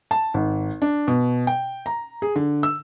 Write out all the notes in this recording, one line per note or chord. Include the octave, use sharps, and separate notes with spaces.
A5
G#1
D4
B2
G5
A#5
G#4
D3
E6